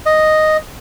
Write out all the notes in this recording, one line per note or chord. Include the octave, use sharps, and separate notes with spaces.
D#5